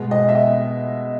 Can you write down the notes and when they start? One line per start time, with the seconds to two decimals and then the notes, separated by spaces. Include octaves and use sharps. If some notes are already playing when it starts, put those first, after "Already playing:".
Already playing: B2 G#3 B3
0.11 D#5
0.29 E5
0.35 D#5